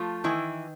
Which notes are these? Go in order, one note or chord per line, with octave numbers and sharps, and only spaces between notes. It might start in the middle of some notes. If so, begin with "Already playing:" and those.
Already playing: F3 A3 F4
D#3 E3 E4